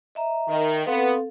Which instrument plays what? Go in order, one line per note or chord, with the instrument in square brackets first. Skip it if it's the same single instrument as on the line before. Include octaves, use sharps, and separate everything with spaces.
[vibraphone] D#5 E5 A#5
[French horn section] D#3
[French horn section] B3 [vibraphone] C4 A4 F5